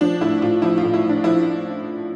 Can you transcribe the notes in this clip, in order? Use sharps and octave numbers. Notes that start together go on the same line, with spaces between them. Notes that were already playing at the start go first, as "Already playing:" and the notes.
F3 D4
A2 E4
A2 F4
F3 E4
F4
A2
E4
F3
D4
F3 E4